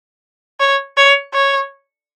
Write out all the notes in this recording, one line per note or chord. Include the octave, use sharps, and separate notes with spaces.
C#5
C#5
C#5